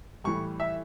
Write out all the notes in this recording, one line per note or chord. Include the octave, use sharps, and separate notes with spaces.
A2 E3 G3 C#6
E5